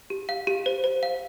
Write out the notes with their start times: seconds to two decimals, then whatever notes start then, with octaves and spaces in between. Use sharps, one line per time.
0.10 G4
0.29 F5
0.47 G4
0.66 C5
0.84 C5
1.03 F5